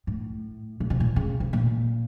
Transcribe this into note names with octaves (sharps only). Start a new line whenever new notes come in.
A2
A#2
C3
A#2
C#3
C3
A#2